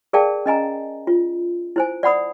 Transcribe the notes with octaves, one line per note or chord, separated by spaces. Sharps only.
G#4 A#4 D5 F5 G5 A5
C#4 D#5 G#5 A#5
F4
E4 C5 G#5
D5 F#5 B5 D#6